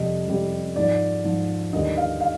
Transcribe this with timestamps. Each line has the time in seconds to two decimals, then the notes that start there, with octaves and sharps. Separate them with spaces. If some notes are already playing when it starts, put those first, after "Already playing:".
Already playing: F2 C3 G3 D#5
0.27 F2 C3 G3
0.76 G#2 F3 D5
1.24 G#2 F3
1.73 D#2 D3 G3 D#5
1.97 F5
2.20 F5